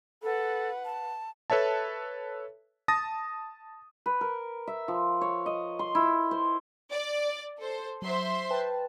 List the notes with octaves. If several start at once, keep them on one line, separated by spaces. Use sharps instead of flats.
A4 B4 F#5
A5
A4 B4 C#5 E5 A5
A5 D#6 A6 A#6
B4
A#4
E5
F3
C#5
D#5
C6
E4
C5
D5
A4 C5
F#3 C5 E5 C6
B4 G5 A5